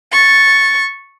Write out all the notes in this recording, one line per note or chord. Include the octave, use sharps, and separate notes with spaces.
C#6 A6